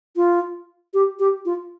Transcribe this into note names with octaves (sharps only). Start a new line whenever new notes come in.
F4
G4
G4
F4